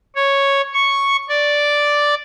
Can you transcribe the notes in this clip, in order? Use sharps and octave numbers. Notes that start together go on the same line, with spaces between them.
C#5
C#6
D5